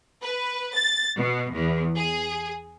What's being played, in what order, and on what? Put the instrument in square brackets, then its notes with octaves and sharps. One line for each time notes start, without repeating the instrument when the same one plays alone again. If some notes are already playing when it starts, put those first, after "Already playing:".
[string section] B4
A6
B2
E2
G#4